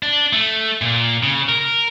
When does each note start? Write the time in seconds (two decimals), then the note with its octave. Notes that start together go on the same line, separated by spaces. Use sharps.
0.03 D4
0.33 A3
0.82 A#2
1.23 C#3
1.49 A#4